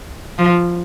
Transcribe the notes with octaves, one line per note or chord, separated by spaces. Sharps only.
F3